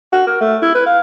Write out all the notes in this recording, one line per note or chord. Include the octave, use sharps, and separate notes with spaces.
F#4
A#4
A3
E4
B4
F5